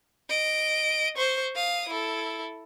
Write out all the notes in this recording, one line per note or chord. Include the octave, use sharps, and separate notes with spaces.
D#5 D7
C5 C#6
F5 D#6
E4 A4